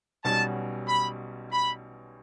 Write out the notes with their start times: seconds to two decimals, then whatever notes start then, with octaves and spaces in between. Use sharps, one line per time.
0.24 B1 B2 G3 C#4 F#4 A5
0.88 B5
1.52 B5